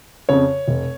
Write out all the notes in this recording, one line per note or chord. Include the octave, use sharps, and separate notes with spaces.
F2 C#3 C#5
F1